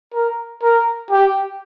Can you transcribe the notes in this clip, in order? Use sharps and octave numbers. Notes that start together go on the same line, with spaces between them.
A#4
A#4
G4